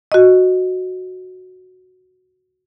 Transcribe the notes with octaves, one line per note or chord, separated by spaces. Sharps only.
F#4 D#5